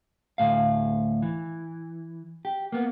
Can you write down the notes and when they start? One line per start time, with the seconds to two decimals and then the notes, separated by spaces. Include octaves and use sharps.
0.38 D2 A2 F5
1.22 E3
2.45 G4
2.72 A#3 B3